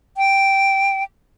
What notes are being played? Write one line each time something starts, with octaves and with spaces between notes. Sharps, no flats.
G5